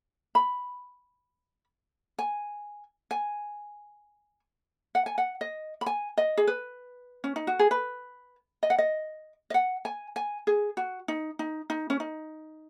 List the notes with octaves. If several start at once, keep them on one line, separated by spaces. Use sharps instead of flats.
B5
G#5
G#5
F#5
G#5
F#5
D#5
B5
G#5
D#5
G#4
B4
C#4
D#4
F#4
G#4
B4
D#5
F#5
D#5
D#5
F#5
G#5
G#5
G#4
F#4
D#4
D#4
D#4
C#4
D#4